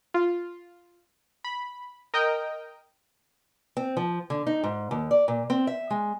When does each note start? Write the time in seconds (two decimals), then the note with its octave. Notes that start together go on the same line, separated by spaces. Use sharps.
0.14 F4
1.44 B5
2.14 A#4 D#5 G5
3.77 C4
3.97 F3
4.30 D3
4.47 D#4
4.64 G#2
4.91 D#2
5.11 D5
5.28 A#2
5.50 C4
5.67 E5
5.90 G#3